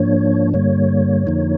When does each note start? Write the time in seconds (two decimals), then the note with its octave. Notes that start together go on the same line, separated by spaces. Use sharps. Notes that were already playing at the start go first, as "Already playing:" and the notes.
Already playing: G#2 F3 A#3 D4 C#5
0.54 G2 D3 G3 A#3 C#5
1.27 F2 D3 F3 A#3 D#4